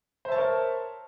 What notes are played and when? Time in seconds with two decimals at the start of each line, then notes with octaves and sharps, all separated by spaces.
0.25 C5
0.28 E5
0.32 A5
0.35 C#5
0.38 A#4